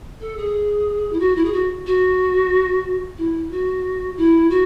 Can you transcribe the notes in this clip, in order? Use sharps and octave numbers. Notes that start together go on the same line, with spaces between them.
A4
G#4
E4
F#4
E4
G#4
F#4
F#4
E4
F#4
E4
F#4